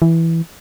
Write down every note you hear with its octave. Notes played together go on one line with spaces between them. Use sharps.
E3